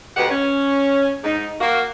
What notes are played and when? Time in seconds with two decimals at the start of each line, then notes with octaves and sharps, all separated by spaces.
0.17 D2 B2 G4 B4 F#5
0.30 C#4
1.24 G#2 D#4
1.61 A#3 F#4